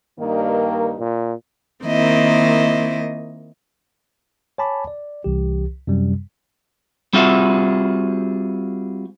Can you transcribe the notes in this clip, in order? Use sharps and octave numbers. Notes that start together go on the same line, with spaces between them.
G2 D#3 A#3
A#2
D#3 A#3 C4 E4 D#5
C#5 G#5 A5 B5 D6
D5
C2 E3 G4
F#2 C3 G3
G3 C4 F4 F#4 G#4 E5